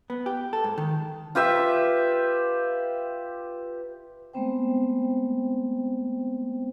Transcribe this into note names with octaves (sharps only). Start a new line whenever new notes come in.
B3
G4
A4
G#2
D#3
F4 G4 B4 E5
G#3 A3 B3 C4 C5 G5